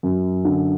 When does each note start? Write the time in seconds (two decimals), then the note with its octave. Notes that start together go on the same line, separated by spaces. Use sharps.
0.03 F#2
0.45 D3